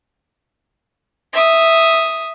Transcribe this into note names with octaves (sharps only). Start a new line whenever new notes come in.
E5 D#6